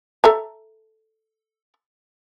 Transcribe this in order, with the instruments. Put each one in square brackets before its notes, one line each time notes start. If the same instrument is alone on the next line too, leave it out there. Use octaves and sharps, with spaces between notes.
[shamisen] A4 E5 A#5